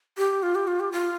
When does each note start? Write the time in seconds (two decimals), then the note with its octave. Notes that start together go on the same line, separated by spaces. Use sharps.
0.18 G4
0.43 F4
0.55 G4
0.67 F4
0.80 G4
0.92 F4